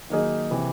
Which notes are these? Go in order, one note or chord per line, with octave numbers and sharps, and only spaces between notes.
D#3 F#3 A#3 D#4 G#4
C3 E3